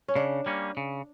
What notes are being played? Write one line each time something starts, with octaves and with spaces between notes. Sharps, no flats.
C#4
C#3 D4
G3 A#3 C#4
C#3